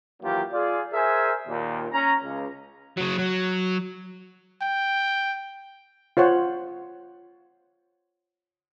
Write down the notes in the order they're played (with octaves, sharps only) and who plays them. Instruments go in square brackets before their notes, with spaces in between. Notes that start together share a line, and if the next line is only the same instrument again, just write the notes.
[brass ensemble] D#2 E3 F#3 A#3 F4 G4
F4 G#4 D5
G#4 A#4 C5 E5 G#5
D#2 A#2
C#4 A#5
C#2
[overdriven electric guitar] C#3 F#3
F#3
[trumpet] G5
[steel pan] F4 C5 C#5 F#5